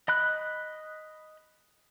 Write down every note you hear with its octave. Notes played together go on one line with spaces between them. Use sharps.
D#5 B5 F#6